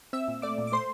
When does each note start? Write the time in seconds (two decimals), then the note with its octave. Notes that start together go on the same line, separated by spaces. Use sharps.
0.13 C4 E5 E6
0.28 A#2
0.42 A3 D5 D6
0.58 A#2
0.67 D6
0.72 A3 C5 C6